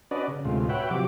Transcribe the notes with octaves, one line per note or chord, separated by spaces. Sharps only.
C#4 D4 F#4 B4 D5 D#5
C#3
D2 A2 C3 G#3 F4
F#4 B4 C#5 E5 F#5 G5
C3 F3 F#3 F#4 G4 D6